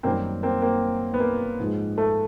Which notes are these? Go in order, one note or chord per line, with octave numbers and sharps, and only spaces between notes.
F#2 D#3 G3 A#3 C4
A#3 C4
A#3 C4
B3
A#3
G#2 F3 G#3
A3